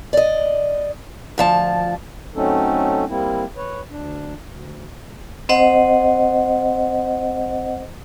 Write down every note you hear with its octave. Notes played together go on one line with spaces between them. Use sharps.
D5 D#5
D2 F3 A5
F#3 A3 C4 C#4 D#4 A4
G3 A#3 C4 E4
B4 C#5
D2 D4
D2
C4 C5 D#5 F#5